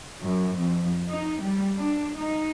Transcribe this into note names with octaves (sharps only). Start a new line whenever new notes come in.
F#2
F2
D#4
G3
D4
D#4